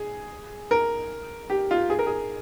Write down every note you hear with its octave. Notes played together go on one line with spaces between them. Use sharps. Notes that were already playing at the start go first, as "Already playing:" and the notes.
Already playing: G#4
A#4
G4
F4
G#4
A#4
G#4